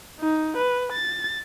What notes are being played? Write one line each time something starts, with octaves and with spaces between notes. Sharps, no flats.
D#4
B4
A6